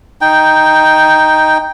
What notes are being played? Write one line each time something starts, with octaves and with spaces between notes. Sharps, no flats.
D#4 G5